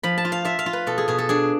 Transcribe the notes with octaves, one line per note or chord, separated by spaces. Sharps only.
F3 B5
A5
F4
F5
F4 E5
F5
F4
B4
B2 A4
G#4
B2 G#4
A4
D4 G#4